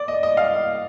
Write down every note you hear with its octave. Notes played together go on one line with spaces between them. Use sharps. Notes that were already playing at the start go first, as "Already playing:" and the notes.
Already playing: D5
D#5
D#5
F5